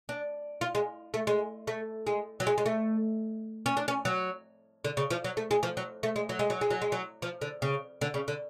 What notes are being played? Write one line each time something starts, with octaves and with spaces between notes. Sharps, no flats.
D4
F4
G#3
A3
G#3
A3
G#3
F#3
G#3
G#3
A3
C#4
D4
C#4
F#3
D3
C#3
F3
F#3
A3
G#3
F3
F#3
A3
G#3
F#3
G#3
F#3
G#3
F#3
G#3
F#3
F3
D3
C#3
D3
C#3
D3